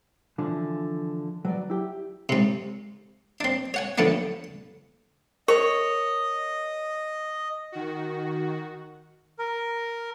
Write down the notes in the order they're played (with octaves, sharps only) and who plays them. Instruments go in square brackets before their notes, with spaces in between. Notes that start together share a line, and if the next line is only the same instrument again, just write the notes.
[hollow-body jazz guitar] D3 E3 F3
F#3 B4 D5
E4 G4
[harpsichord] G#2 C3
C4 D4
C#5 F#5 G#5
D2 D3 F3 B3 C#4 D4
[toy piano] A#4 [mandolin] C#5 [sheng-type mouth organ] D#5 [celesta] C#6
[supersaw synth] D#3 F#4
[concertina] A#4